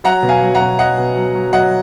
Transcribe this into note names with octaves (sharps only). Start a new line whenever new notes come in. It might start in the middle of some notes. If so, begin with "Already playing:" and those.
F#3 F#5 A#5
B2
F5 G#5
F#3
F#5 A#5
B2
F#3 D#5 F#5
B2
F#3
F#3
F#3 D#5 F#5